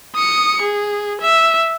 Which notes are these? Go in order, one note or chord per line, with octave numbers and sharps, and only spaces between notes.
D#6 C#7
G#4
E5